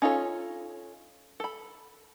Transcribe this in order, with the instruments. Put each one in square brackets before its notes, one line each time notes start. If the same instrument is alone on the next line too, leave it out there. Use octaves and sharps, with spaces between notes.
[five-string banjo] C#4 D#4 F4 A4 C#5
A4 B5